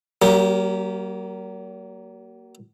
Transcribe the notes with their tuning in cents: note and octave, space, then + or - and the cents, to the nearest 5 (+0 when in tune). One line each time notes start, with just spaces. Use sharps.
F#3 +40 A#3 +0 G4 +0